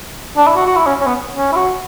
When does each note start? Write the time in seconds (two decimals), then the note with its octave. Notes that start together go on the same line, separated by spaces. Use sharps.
0.37 D4
0.47 E4
0.56 F#4
0.66 F#4
0.76 E4
0.86 C#4
1.01 C#4
1.06 B3
1.37 C#4
1.52 E4
1.56 F#4